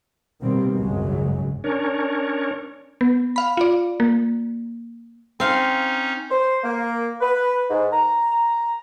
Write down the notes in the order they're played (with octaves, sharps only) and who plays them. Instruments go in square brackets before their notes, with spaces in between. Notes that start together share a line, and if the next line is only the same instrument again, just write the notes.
[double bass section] B2 D#3 G3 A#3 C4
G#1 C#2 F#2 C#3 F#3 G#3
[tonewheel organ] C#4 D4 A#4 C#5
[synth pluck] B3
F5 B5
F4 D5
A#3
[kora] C4 F5 [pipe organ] C#4 D#4
[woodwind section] C5
A#3
B4
G#2
A#5